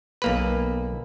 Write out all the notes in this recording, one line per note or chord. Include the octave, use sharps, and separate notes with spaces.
B1 A#3 B4